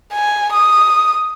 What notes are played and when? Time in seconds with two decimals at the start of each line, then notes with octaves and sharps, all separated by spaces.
0.13 G#5
0.53 D#6